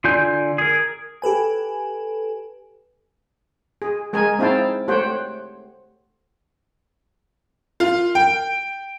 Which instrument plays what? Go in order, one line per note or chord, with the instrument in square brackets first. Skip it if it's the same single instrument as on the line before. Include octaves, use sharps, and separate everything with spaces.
[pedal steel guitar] D3 F4 D5 G#5 G6
G#4 A#4
[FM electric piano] G4 A4 B4 G#5
[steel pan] G#4
G#3 G#4 A#4 G#5
C4 D#4 E4 F5 G5 A5
A3 G4 C5 C#5 F#5 G5
[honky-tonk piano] F4
G5